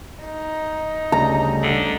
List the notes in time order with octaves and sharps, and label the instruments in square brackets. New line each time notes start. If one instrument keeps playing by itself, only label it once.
[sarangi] D#4
[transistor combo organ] D2 C#3 G3 [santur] A#5
[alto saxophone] D3